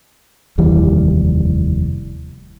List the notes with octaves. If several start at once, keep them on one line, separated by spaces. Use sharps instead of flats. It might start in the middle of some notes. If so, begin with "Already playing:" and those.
F1 D#2 E3 G3